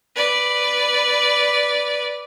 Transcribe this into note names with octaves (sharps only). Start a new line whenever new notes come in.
B4 D5